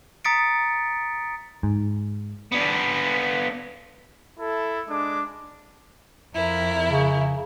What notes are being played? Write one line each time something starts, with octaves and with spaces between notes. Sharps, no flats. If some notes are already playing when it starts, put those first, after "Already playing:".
A#5 D#6 A6 B6 C#7 D7
G#2
B3 D4
E4 A4
G#3 D4 D6
F2 E4 A#4
C#3